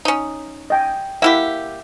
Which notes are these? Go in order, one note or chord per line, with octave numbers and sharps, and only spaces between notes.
C#4 D#4
D#5 G5 G#5
A#3 E4 G4 E5 F#5